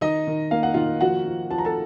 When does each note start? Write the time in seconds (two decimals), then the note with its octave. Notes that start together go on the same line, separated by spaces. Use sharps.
0.01 D#3 D#4 D#5
0.27 D#3
0.51 A#3 F5
0.63 F#5
0.74 D#3 F4 F5
1.01 F3 F#4 F#5
1.25 F3
1.50 F3 A5
1.58 A#5
1.65 A4 A5